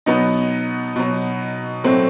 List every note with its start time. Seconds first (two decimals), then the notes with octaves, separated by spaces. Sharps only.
0.06 B2 F#3 B3 D#4
0.96 B2 F#3
1.84 A2 F#3 A3 C4